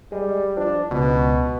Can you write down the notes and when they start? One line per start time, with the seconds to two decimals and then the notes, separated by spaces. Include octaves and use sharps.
0.12 G3 G#3
0.57 F3 D4
0.91 C#2 B2